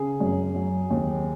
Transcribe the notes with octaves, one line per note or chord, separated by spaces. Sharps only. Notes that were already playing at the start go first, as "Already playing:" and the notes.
Already playing: C#3 G#4
F#2
F#3
D#2